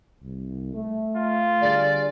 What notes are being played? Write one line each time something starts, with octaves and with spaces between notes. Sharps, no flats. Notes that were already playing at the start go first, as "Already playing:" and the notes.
C2
A3
F4
D3 G3 G#4 D5